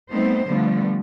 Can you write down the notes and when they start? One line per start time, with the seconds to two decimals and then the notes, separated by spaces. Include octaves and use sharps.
0.12 G3 A3 B3 C4 D#4 C5
0.46 D3 F3 G3 A3 B3